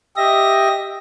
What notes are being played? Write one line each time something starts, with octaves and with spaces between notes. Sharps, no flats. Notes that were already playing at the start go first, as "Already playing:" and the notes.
G4 D#5 E5 A#6